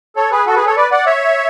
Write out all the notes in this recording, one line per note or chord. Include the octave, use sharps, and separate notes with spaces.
A4 C#5
G#4 B4
F#4 A4
G#4 B4
A4 C#5
B4 D5
D5 F#5
C#5 E5